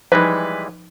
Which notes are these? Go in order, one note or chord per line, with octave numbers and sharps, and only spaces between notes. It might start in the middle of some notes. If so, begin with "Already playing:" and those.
E3 F3 G3 G#3 D#4 B4